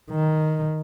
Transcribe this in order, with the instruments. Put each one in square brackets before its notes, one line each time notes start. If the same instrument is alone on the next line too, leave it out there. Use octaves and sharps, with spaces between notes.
[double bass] D#3